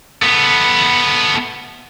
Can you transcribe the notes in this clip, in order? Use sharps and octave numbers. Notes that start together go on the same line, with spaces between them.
A3 B3